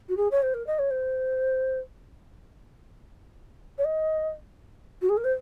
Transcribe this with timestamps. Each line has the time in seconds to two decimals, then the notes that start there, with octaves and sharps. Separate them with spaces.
0.09 F#4
0.17 G#4
0.31 C#5
0.42 C5
0.54 A#4
0.67 D#5
0.79 C#5
0.91 C5
3.78 C#5
3.85 D#5
5.02 F#4
5.09 G#4
5.17 A#4
5.24 C5